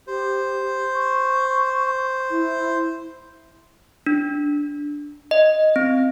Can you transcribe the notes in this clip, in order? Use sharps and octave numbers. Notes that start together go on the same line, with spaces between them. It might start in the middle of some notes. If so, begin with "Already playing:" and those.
G4 C5
C#6
E4
D4
D#5
C4